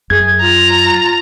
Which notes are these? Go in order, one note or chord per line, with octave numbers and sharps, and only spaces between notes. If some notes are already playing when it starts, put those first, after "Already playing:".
F#2 G#4 G#6
F4 A#5